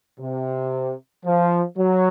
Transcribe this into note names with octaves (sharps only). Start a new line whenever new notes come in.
C3
F3
F#3